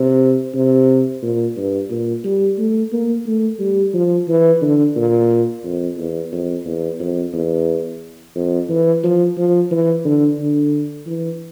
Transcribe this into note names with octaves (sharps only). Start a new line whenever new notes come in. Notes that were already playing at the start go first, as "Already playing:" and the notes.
Already playing: C3
C3
A#2
G2
A#2
G3
A3
A#3
A3
G3
F3
E3
D3
A#2
F2
E2
F2
E2
F2
E2
F2
E3
F3
F3
E3
D3
D3
E3